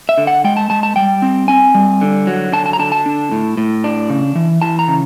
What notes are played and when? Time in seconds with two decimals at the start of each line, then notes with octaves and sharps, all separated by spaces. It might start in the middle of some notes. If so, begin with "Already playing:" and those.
0.09 E5
0.18 D3
0.27 F#5
0.44 G#3 G5
0.57 A5
0.70 G#3 A5
0.83 A5
0.96 G3 G5
1.22 C4
1.48 C4 G#5
1.75 G3
2.01 D3
2.27 F#3
2.53 D3 A5
2.66 A5
2.73 A#5
2.79 D3 A5
2.92 A5
3.06 D4
3.32 A2
3.57 A2
3.84 D4
4.10 C#3
4.36 E3
4.62 E3 A5
4.79 A#5
4.88 C#3